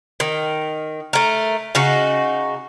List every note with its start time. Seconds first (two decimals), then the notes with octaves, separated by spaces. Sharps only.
0.20 D#3
1.13 A3 A#4
1.75 C#3 D#4 F#4